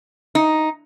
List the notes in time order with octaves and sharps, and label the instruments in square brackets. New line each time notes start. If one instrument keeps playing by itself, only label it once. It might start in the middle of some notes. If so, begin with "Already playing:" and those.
[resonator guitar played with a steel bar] D#4